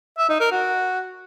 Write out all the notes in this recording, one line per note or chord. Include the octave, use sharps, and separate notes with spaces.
E5
D#4
A#4
F#4